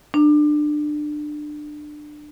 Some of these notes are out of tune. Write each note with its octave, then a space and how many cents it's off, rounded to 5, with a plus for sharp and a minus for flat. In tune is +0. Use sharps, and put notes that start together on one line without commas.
D4 +25